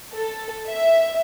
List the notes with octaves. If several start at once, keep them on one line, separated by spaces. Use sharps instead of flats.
A4
E5